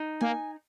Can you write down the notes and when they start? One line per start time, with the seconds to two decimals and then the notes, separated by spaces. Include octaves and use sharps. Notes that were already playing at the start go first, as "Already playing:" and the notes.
Already playing: D#4
0.21 A#3 G#5